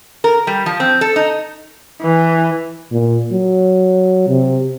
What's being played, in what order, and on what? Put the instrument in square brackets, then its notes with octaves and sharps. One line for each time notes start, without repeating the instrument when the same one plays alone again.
[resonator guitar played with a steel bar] A#4
G3
F3
C4
A4
D#4
[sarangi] E3
[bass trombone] A#2
F#3
C3